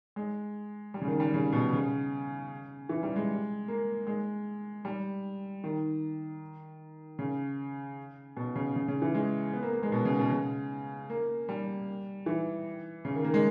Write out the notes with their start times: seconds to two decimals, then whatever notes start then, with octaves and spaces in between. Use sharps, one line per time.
0.16 G#3
0.94 G3
1.01 C#3
1.08 D#3
1.20 G3
1.34 C#3
1.53 B2
1.73 C#3
2.89 E3
3.03 G3
3.16 G#3
3.68 A#3
4.07 G#3
4.85 G3
5.64 D#3
7.19 C#3
8.37 B2
8.56 C#3
8.76 C#3
8.88 C#3
9.02 E3
9.15 G#3
9.53 B3
9.63 A#3
9.73 A#3
9.83 G#3
9.92 B2
10.05 C#3
10.19 B2
10.31 C#3
11.10 A#3
11.49 G3
12.26 E3
13.05 C#3
13.15 D#3
13.24 A#3
13.34 G#3